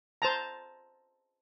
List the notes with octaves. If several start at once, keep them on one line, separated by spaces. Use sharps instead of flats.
C5 A5 A#5